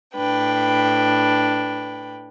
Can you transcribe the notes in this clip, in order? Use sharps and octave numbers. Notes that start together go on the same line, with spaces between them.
A2 D4 B4 G5